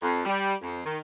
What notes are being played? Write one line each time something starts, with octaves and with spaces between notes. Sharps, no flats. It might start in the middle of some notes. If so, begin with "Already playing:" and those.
F2
G3
F2
D#3